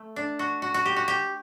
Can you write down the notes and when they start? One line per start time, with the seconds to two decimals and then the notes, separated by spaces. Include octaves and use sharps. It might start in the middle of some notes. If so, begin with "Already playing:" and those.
Already playing: A3
0.16 D4
0.39 F#4
0.62 F#4
0.74 F#4
0.86 G4
0.96 F#4
1.08 G4